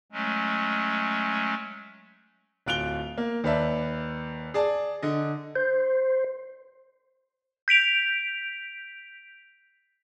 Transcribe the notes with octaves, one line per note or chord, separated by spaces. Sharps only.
F#3 G#3 A3 C#4
D1 F4 F#6 D7 F7 G7
A#3
D#2 B4 D5 E5 A5
G#4 D5 A5
D3 D#5
C5
G6 B6 D7 F7